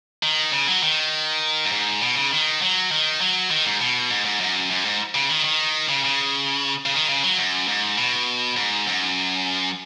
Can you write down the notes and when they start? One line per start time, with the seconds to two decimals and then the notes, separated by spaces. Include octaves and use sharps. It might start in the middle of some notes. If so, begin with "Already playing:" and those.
0.23 D#3
0.53 C#3
0.67 F#3
0.83 D#3
1.65 F#2
1.72 G#2
2.02 B2
2.17 C#3
2.31 D#3
2.62 F#3
2.91 D#3
3.21 F#3
3.51 D#3
3.65 G#2
3.81 B2
4.11 G#2
4.25 G#2
4.40 F#2
4.71 F#2
4.85 G#2
5.15 C#3
5.30 D#3
5.45 D#3
5.89 C#3
6.04 C#3
6.86 C#3
6.93 D#3
7.08 C#3
7.23 F#3
7.38 F#2
7.68 G#2
7.98 B2
8.57 G#2
8.87 F#2